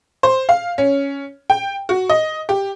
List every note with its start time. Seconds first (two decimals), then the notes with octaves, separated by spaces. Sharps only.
0.23 C5
0.49 F5
0.78 C#4
1.50 G5
1.89 F#4
2.09 D#5
2.49 G4